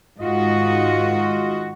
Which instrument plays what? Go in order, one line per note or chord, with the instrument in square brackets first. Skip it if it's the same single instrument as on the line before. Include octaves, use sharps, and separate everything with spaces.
[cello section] G#2 D#3 F#4 [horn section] F4 D#5